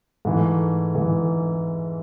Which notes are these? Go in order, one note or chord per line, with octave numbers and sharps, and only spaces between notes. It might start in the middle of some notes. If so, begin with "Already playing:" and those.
G#2 E3 A3
G#2 E3 A3